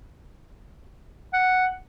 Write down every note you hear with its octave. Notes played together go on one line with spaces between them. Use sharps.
F#5